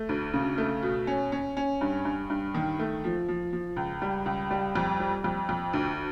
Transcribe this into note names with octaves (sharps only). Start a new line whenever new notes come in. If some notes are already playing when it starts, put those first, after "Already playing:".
Already playing: A3
D2
C#3
A3
B2
C#4
C#4
C#4
G2
G2
G2
D#3
A3
F3
F3
F3
C#2
G3
C#2
G3
F2
G3
F2
F2
D2